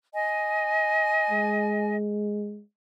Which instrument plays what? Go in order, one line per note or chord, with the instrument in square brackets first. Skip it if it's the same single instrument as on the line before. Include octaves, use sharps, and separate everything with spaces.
[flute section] D#5 G#5
[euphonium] G#3